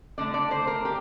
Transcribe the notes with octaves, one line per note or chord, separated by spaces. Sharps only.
D3 A3 D5
D5
C5
A#4
G4